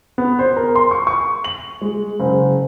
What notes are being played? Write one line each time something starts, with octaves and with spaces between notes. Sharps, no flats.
B3
C5
A#4
C6
C#6
C#6
F#7
G#3
F#1